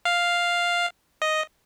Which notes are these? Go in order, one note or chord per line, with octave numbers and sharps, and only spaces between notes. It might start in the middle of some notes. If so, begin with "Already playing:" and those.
F5
D#5